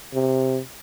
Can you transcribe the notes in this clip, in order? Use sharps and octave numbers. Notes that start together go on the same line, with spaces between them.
C3